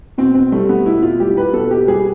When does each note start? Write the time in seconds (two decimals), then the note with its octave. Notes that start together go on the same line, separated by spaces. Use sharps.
0.18 B2 C4
0.34 C4
0.52 G3 A3
0.69 B3
0.86 B2 E4
1.03 F4
1.20 G3 G4
1.37 B4
1.53 B2 A4
1.71 G4
1.87 G3 G#4